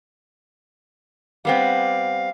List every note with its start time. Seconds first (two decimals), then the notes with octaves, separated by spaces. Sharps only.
1.45 G3 B3 C4 F5